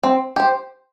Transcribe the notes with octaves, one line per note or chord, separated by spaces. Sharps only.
C4
G4 C5